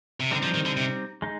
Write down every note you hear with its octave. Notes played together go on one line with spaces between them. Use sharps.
C3
D3 G3 C4 D#4
F3
D#3
D3
C3
G#3 D#4